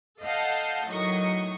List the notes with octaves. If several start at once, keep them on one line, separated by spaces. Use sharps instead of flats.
A4 D#5 F5 F#5 A5 G6
A2 D#3 F#3 D#5 C#6 D#6